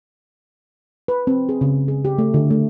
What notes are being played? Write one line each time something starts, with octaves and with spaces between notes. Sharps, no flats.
B4
C4
G#4
C#3
G#4
G4
A3
D3
A3